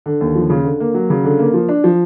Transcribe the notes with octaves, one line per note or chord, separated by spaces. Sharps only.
D3
D#2
F3
C#3
D3
A#3
F#3
C#3
D3
A#3
F3
D4
F3